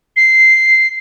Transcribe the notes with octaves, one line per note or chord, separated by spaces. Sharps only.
C7